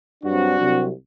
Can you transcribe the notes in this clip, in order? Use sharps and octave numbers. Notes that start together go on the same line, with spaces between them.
G2 F#3 C4 D4 F#4
C2 C3 F#3 C4